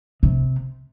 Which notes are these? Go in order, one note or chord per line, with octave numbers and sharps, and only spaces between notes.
C3